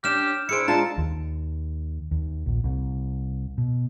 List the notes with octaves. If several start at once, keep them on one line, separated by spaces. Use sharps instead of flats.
C#4 D4 G4 F6 E7
D4 E4 G#4 C5 C#7 D7
G#3 D4 F4 C5 A5 A#5
D#2
D#2
A#1
C2
B2